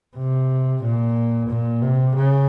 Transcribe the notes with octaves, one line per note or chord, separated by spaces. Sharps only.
C3
A#2
A#2
C3
C#3